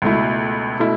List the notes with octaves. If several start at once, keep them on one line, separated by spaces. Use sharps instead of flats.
C#2 B2 A3 E4
B2 A3 E4